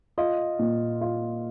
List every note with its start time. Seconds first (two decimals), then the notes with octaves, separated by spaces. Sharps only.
0.18 F4 D#5
0.59 A#2
1.01 F4